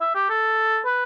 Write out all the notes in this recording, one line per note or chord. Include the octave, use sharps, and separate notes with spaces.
E5
G4
A4
B4